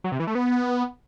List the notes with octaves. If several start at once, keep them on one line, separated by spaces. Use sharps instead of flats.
F#3
C3
E3
A3
B3